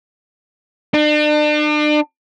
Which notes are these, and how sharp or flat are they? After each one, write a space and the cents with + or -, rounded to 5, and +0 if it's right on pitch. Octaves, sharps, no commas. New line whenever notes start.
D4 +40